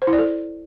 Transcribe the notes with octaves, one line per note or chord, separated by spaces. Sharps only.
C5
E4
D5
A4